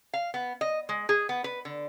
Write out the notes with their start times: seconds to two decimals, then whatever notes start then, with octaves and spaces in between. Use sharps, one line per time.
0.13 F5
0.34 B3
0.61 D#5
0.89 G#3
1.09 G#4
1.29 B3
1.44 B4
1.65 D3